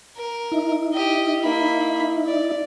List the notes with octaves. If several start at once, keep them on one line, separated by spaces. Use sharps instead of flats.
A#4
D#4 E4
G4 D#5
A#3 B5
D5